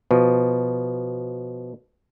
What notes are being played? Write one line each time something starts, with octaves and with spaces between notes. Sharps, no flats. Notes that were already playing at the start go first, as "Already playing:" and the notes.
B2 F3